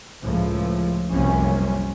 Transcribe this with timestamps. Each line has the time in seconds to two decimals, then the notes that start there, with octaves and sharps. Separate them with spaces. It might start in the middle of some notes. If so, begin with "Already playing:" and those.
0.22 C#2 A2 F3
1.11 F1 C2 F#2 C3 A#3 C#4